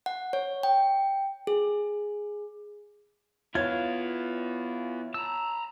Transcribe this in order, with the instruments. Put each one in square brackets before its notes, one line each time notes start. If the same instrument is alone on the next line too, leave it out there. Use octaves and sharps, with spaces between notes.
[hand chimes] F#5
C#5
G5
G#4
[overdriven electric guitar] B3 E4 [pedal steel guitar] F4 F5 [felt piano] C#5 G#6
[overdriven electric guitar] A5 A#5 [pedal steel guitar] E6